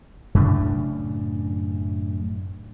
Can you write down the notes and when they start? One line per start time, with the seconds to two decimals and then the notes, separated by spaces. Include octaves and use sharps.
0.35 F#2 A2 C#3 D4